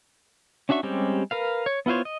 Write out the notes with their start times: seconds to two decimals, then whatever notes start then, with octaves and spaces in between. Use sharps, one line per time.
0.69 C#4 D4 F#4 E5 C#6
0.83 G3 G#3 C4 C#4 G4
1.31 A#4 B4 F5
1.66 C#5
1.86 B3 E4 F4 C5 C#5
2.05 D#5